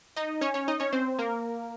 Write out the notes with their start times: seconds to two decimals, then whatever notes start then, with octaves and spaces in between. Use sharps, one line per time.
0.16 D#4 D#5
0.41 C#4 C#5
0.54 C#4 C#5
0.68 D#4 D#5
0.80 C#4 C#5
0.93 C4 C5
1.19 A#3 A#4